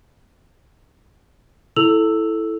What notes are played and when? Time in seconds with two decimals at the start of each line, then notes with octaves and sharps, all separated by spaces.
1.76 E4 A4 E6 F7 F#7